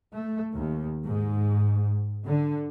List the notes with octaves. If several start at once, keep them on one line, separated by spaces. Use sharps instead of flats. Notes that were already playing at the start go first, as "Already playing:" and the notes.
A3
D#2
G#2
D3